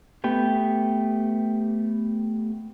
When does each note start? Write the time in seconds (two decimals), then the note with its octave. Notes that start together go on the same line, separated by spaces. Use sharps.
0.24 A3 B3 G4